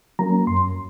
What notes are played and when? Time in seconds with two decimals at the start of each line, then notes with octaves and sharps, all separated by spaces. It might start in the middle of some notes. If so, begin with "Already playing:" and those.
0.19 F#3 A#3 C#4 A#5
0.47 F#2 C6